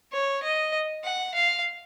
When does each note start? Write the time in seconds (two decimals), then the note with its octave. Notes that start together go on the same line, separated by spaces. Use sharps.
0.13 C#5
0.43 D#5
1.04 F#5
1.35 F5